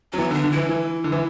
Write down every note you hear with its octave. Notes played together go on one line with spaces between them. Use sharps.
F#3 C#4
E3 B3
D3 D4
D3
E3 E4
E3
D3
E3